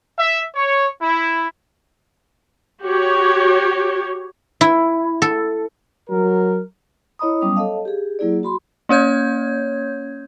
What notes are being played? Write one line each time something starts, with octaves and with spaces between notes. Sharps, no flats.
E5
C#5
E4
F#4 G4 C#5
E4
A4
F#3 A#4
E4 C#5 D#5 A#5 B5 D#6
F#3 G3 B3 C#4 D6 D#6
A4 C#5 D#5 F5 A5
G4 G#4
F#3 A#3 E4 G#4 D5
F#4 B5 C6
A#3 C#4 C#5 G6 G#6